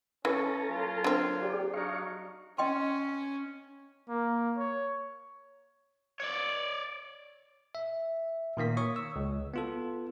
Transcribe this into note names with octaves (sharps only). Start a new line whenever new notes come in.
E3 C#4 A4 A5 A#5
F#3 A#3 F4
D3 C4
G4 G#4 D5
F#3 D4 D#4 F5 C#6
C#4 D#5 G5 C6
A#3
C#5
C#5 D5
E5
A#2 D#3 A#3 B6
C#5 C#6 D#6
E6
C#2
B3 F4 A4